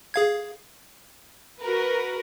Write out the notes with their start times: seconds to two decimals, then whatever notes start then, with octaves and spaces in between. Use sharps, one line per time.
0.14 G#4 F5 G#6
1.60 F#4 A#4 B4